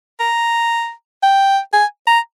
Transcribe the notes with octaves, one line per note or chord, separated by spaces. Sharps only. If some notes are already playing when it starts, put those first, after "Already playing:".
A#5
G5
G#5
A#5